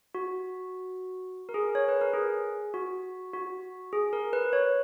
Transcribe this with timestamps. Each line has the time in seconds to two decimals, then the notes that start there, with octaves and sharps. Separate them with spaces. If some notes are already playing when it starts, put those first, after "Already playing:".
0.15 F#4
1.49 A#4
1.54 G#4
1.75 C#5
1.88 B4
2.01 A#4
2.13 G#4
2.74 F#4
3.33 F#4
3.93 G#4
4.13 A#4
4.33 B4
4.53 C#5